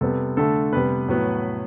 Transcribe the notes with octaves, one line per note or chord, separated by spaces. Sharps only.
C3 G3 B3 A4
D3 A3 A4
C3 G3 B3 B4
A2 F#3 B3